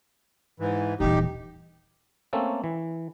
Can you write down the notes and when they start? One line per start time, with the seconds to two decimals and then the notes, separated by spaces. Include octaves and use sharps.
0.60 G#2 E3
1.00 D#1 E3 D#4 G4
2.33 A3 A#3 C4 C#4 A4
2.64 E3